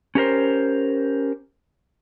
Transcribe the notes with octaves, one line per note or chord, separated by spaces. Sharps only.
C#4 G4 A#4 C5